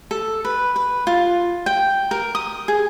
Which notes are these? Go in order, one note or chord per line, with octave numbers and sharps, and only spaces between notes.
A4
B4
B4
F4
G5
A#4
D#6
G#4